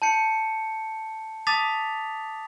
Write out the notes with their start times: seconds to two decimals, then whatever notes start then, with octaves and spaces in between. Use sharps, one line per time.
0.02 A5 G6 C#7
1.47 A5 D6 D#6 A6 B6 F7